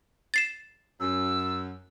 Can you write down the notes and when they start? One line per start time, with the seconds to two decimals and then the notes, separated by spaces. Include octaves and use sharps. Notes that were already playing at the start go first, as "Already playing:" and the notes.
0.34 A6 C7 E7
1.00 F#2 E6